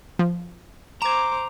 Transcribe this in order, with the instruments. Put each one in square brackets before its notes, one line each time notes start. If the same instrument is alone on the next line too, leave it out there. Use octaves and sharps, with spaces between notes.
[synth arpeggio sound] F3
[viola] C5 D6 [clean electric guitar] A#5 [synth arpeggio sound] G#6 E7